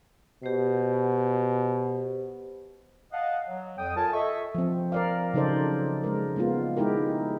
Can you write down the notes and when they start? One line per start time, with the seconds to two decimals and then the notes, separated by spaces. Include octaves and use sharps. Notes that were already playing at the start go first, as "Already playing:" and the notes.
0.43 B2 G4 C5
3.12 D#5 F5 F#5 A5
3.47 F#3
3.78 F2 G5 D#6
3.97 F4 A4 A#4 C#5 G#5 A5
4.13 A4 D#5 E5 C#6
4.55 F3 C4
4.92 A#4 D5 F5
5.34 C#3 F#3 D#4 A4 C5 D5
6.04 G#3 A#4
6.36 G#3 A#3 B3 F4
6.77 G#3 D#4 E4 G4 A#4